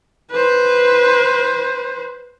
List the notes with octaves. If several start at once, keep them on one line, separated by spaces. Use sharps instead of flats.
B4 C5